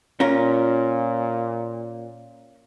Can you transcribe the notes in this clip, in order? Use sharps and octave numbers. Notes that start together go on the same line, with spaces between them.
A#2 C#4 F4 A#4